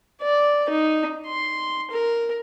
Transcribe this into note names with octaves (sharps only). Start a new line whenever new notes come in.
D5
D#4
C6
A#4